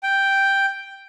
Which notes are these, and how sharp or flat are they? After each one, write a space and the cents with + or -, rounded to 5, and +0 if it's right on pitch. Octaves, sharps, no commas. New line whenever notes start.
G5 +0